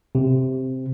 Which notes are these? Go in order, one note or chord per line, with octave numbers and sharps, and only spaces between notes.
C3